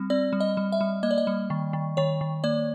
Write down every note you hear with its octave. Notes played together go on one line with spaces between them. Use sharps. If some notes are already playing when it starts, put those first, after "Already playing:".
Already playing: G3 C4
C4 D5
G3
D#5
G3
E5
G3
A#3 D#5
D5
D#5
G3
D#3
D#3
D#3 C#5
D#3
A#3 D5